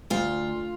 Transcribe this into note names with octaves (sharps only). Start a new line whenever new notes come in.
D2 F4